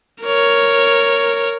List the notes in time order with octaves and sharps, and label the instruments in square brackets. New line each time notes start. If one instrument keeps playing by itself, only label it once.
[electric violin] A#4 C#5